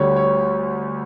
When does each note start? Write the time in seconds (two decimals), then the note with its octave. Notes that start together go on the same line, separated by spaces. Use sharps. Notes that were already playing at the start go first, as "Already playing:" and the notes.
Already playing: D2 D3 G3 C#5
0.16 C#5